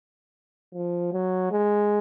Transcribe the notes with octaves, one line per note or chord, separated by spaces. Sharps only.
F3
F#3
G#3